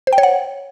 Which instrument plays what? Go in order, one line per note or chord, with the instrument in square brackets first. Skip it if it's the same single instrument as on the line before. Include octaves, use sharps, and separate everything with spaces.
[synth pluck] C5
G5
C#5
F#5